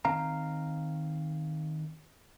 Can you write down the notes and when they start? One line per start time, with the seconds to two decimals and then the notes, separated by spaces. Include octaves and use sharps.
0.05 D#3 C4 F5 A#5